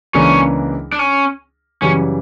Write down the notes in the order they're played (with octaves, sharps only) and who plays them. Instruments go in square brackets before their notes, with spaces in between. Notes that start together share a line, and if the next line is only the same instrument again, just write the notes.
[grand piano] C#2 C#3 E3 A#3 D4 [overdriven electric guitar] C#4
[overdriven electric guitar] D4
C#4
[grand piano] F#2 C#3 E3 G3 [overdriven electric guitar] C#4